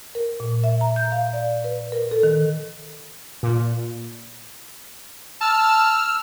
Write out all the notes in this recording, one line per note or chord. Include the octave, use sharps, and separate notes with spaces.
A#4
A#2
E5
A#5
G6
F5
D5
B4
A#4
A4
D#3
A#2
A5 E6 F6